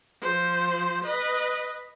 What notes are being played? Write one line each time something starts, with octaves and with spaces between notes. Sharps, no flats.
F3 C5
B4 D#5